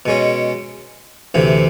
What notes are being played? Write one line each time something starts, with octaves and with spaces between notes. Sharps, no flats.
B2 G#3 C#4
D2 C3 E3